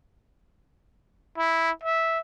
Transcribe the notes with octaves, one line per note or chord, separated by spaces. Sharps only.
E4
E5